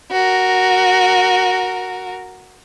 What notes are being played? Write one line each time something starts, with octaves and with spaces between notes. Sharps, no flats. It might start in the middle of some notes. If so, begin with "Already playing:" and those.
F#4 A#4